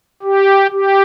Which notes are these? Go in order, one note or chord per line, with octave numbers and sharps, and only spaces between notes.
G4
G4